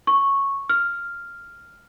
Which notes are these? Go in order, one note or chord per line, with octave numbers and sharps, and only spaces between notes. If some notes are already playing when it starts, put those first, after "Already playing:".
C#6
F6